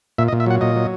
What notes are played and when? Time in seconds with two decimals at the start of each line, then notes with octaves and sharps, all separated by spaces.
0.18 A#2 E5
0.28 D#5
0.32 A#2
0.40 E5
0.46 F#3 F#5
0.61 A#2 D#5
0.76 F#3